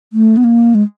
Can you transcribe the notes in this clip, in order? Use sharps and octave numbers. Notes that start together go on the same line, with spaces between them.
A3
B3
A#3
G#3